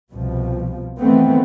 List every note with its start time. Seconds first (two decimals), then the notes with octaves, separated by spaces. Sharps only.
0.12 C2 B2 F3
0.99 D#3 E3 A3 B3 C4